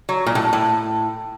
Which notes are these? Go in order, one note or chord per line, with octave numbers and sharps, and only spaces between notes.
F#3
A#2
A2
A2